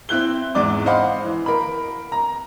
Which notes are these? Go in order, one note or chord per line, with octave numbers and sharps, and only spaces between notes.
C4 E4 F#6 G7
E2 G#2 D5 D6
C5 D#5 F5 F#5 B5
E3
A#4 B5
A#5